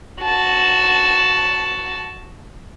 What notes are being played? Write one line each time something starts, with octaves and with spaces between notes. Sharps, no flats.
F#4 A5